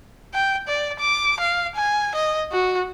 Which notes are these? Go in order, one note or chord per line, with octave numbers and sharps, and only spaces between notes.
G5
D5
D6
F5
G#5
D#5
F#4